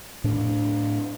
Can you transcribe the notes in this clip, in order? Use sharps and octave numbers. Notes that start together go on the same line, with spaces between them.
A2 D4